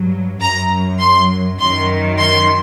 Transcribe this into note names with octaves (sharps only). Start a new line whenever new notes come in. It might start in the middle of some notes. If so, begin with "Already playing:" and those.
Already playing: G2 F#3
F#2 F#3 A#5
C6
F#2 D#3 F#3 C6
C6